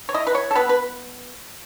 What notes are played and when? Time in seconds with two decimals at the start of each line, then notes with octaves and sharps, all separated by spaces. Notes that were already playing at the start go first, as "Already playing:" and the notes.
0.09 C#5
0.14 E4 D#5
0.27 B4
0.35 C#5
0.51 A4
0.55 B3 B4
0.69 B4